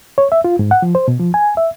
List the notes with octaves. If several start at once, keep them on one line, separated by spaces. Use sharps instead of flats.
C#5
E5
F4
G#2
F#5
F3
C5
B2
F3
G#5
E5